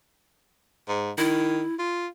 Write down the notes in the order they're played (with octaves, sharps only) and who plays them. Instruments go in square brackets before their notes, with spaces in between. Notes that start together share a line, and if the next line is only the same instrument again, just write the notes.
[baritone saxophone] G#2
[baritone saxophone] D#3 [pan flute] E4
[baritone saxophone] F4